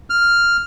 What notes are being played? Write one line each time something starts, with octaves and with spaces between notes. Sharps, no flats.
F6